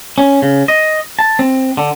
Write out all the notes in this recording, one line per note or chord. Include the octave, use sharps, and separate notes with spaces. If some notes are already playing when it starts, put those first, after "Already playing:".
C#4
C#3
D#5
A5
C4
D3